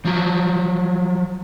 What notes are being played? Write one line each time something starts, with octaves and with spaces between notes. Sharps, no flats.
F3 F#3